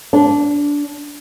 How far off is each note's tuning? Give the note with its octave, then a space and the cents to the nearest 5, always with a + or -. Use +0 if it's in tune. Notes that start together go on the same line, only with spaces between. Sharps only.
D4 -20